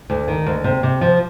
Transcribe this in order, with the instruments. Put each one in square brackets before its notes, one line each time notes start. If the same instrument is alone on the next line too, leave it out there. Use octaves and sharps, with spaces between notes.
[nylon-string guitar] D2
D#3
D2
C3
C3
F3